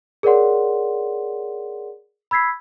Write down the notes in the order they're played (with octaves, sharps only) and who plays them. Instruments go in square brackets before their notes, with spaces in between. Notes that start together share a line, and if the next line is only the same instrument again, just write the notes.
[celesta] G#4 A#4 C#5 D5 F#5 C6
B5 E6 G#6 B6 C7